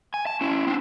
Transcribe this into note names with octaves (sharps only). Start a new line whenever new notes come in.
G#5
A5
C#4 E4
C4 D4